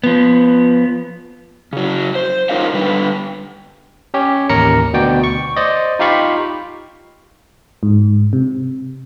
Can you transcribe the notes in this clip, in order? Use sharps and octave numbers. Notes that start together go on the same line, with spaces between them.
F3 B3
C#3 F#3
C5
D#4 F4 A#4 C#5 D#5 F5
D3 G3 B4
C#4 G4 C#5
A1 D#2 A#4 A#5 A#6 C#7
D2 B2 F#4 D5 G5
C#6
C5 D5 D#5
D#4 F4 G4 F5 B5 C#6
G#2
C3